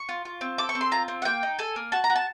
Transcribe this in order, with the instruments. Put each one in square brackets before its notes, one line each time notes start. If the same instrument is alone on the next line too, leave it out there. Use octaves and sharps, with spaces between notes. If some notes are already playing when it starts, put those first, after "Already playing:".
Already playing: [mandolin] C#6
F4
F4
C4
A4 D6
C#6
C4
C6
F4 A#5
C4
F#5
A#3 G5
D#4
A4 G#5
A#3
F#4 A5
A#5
F#4
A5